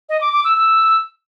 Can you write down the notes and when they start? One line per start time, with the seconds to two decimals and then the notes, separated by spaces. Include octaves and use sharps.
0.09 D#5
0.21 D6
0.33 D6
0.45 E6
0.56 E6